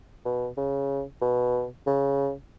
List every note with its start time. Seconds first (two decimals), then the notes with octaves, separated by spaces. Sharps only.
0.25 B2
0.57 C#3
1.21 B2
1.86 C#3